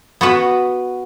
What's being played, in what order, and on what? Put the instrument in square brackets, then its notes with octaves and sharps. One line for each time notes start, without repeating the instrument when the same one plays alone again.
[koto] B3 F#4 B4